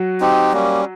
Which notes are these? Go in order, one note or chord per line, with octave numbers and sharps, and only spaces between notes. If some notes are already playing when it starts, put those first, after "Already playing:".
Already playing: F#3 F#4
C4 D#4 G4
G3 A#3 C#4